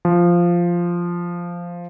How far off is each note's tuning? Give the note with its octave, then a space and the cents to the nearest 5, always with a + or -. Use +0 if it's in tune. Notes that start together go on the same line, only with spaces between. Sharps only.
F3 -5